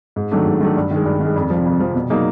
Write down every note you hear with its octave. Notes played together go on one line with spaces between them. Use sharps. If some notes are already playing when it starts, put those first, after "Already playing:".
G#2
D#3 F#3 A3 D4
G#2
D#3 F#3 A3 D4
G2
D#3 G#3
G2
D#3 G#3
F2
C3 F3
F2
C3 F3
B2
F#3 A#3 D#4 G#4